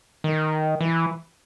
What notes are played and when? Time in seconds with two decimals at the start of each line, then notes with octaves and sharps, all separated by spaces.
0.24 D#3
0.81 E3